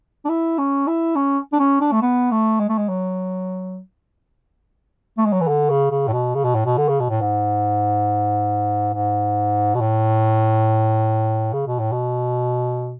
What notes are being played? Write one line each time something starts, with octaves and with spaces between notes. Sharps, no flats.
D4
E4
C#4
E4
C#4
D4
C#4
D4
A3
B3
A3
G#3
A3
G#3
F#3
A3
G#3
F#3
E3
D3
C#3
C#3
A2
B2
C#3
B2
A2
B2
D3
C#3
B2
A2
G#2
G#2
B2
A2
C#3
B2
A2
B2